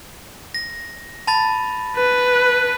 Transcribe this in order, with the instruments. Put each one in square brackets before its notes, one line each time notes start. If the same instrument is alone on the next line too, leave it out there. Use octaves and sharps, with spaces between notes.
[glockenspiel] A#6
A5 B5 A6
[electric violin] B4